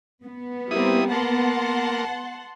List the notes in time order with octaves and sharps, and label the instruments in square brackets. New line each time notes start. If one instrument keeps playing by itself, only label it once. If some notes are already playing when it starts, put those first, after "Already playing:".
[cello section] B3
[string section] G3 A#3 C4 [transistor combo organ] E4 D#6
[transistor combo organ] A#3 [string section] F#5 A5 C6